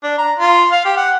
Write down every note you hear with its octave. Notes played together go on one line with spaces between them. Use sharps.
D4
A#5
F4
F5
G4
F#5